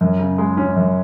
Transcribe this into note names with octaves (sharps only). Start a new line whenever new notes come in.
F#2
C#3
G#3
C#4
F#2